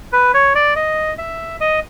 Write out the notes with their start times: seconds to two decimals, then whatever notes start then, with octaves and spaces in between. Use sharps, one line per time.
0.13 B4
0.34 C#5
0.55 D5
0.76 D#5
1.18 E5
1.61 D#5